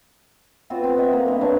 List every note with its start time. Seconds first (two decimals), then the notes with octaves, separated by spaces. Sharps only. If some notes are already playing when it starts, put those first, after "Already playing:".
0.70 B3 C4 F4 F#4
0.84 C4
0.98 D#5 E5
1.13 A#3
1.26 G2 B3
1.41 F#3 D4 C#5